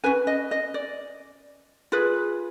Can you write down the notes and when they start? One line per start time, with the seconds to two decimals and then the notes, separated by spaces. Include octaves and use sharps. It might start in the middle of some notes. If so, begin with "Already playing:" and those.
0.04 C#4 F#4 B4 G#5
0.27 D#5
0.51 D#5
0.74 D5
1.92 F4 G#4 B4